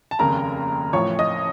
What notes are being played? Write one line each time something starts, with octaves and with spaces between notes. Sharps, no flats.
A5
F1 D#2 C#3 A#4 A#5
A1 A2 F3 C#5 C#6
D#5 D#6